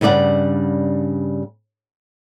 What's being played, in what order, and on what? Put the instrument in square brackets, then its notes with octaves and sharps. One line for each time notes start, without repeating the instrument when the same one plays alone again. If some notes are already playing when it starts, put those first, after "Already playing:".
[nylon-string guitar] G2 C#3 G3 D5 F#5